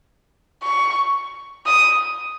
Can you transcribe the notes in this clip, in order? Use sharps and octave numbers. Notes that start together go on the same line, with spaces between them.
C#6
D#6